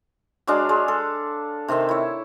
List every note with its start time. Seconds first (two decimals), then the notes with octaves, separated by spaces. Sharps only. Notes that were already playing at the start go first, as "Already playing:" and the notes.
0.47 F#3 G#3 D4 F5
0.69 G#3
0.88 A4
1.68 C3 D#3 C4 E5
1.89 E4 C#5